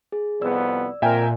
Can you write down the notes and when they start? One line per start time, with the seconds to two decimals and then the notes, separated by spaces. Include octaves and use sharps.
0.12 G#4
0.41 C2 F2 B3 D5 E6
1.02 F2 A#2 A#4 E5 G5 G#5